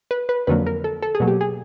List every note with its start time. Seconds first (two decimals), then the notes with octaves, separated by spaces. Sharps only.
0.11 B4
0.29 B4
0.47 F2 D3 F#3 A#3 B4
0.66 A#4
0.84 A4
1.02 A4
1.15 G#4
1.20 B2 F#3 A#3
1.28 G4
1.41 G#4